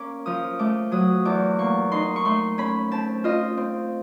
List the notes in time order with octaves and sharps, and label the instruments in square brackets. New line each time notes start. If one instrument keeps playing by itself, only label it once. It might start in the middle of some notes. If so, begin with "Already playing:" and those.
Already playing: [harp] A#3 C#4 D6
F3 D#6
A3 D6
F#3 D#6
E2 D6
A#3 C#6
D#4 C6
C#6
A3 C6
C#4 B5
C4 A5
F4 D#5
C4